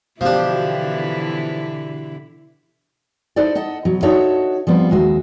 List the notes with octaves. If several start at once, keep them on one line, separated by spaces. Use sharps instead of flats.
B2 D3 E3 F3 D4 E4 G4
D#4 E4 A4 C5 D5
A4 D#5 F#5
B2 F#3
D4 D#4 F#4 A4 C#5 E5
F3 G3 B3 C4
D#2 G#3 F#4 E5